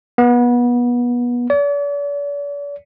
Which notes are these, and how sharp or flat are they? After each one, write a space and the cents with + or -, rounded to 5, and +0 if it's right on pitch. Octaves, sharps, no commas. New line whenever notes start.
B3 -25
D5 -45